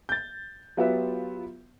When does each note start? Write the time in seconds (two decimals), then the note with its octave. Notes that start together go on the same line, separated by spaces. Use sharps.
0.09 G6 A6
0.77 F#3 B3 F4 G4 B4 E5